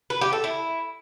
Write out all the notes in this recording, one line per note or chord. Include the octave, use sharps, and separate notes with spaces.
B4
G4
A4
E4